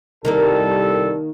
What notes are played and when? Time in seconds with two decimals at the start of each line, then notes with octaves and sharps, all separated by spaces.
0.25 C2 D#3 G3 A#3 A4 A#4